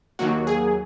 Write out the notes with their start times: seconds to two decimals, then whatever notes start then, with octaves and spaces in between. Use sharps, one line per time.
0.19 D#2 D#3 F#3 A#3 F#4
0.47 G#4